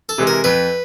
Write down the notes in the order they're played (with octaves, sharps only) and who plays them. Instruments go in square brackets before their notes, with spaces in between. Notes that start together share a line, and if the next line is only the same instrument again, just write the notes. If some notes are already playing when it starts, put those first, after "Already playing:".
[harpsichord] A4
[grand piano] C3 E3 G#3
[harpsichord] A#4
[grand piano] F2 [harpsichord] B4